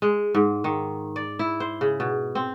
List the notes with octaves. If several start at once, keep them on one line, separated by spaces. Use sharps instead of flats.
G#3
G#2
D#3
D5
E4
C5
C#3
B2
C4